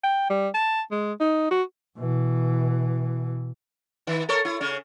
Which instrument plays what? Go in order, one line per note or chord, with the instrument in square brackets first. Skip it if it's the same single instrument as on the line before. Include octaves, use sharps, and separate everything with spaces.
[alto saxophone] G5
G3
A5
G#3
D#4
F#4
[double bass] B2 E3
[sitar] D#3
A4 A#4 C#5
E4
C#3 C#4